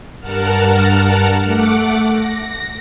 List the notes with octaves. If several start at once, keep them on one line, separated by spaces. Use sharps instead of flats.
G2 A#4 F#5 A5 F6
A3 F#5 D6
A#6